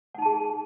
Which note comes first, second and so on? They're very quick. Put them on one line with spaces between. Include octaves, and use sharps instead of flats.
F#5 D#4 A5 G#4